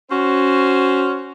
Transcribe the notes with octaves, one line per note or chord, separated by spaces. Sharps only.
C#4 F#4 C5